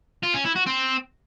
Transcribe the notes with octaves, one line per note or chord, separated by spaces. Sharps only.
F4
C#4
E4
F#4
C4